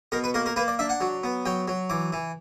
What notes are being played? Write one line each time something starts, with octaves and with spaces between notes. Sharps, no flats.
B2 A#4
B4
A#3 A#4
A#4
A#3 B4
D5
D4 E5
F#5
F#3
B3
F#3 G5
F#3
E3 D6
E3